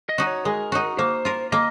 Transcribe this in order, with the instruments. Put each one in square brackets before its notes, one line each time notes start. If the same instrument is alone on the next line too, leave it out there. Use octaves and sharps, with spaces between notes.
[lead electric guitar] D#5
[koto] D#4 F#4
[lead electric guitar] C#5
[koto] G#3 [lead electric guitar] A#4
[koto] D#4 F#4
[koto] A#3 [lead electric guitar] C5
[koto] F4 A#4
[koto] A#3 [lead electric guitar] D#5